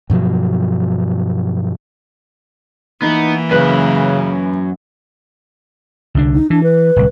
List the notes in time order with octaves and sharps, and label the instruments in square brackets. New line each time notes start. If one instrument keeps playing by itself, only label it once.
[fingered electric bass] G2 B2 F3 F#3
[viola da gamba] E3 A#3 [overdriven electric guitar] B3 [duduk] D#4
[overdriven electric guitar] F#2 [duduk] C#3 [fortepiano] B4
[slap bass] C2 D3 D4
[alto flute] D#4
[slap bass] E3 [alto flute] D4
[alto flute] B4
[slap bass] D1 C2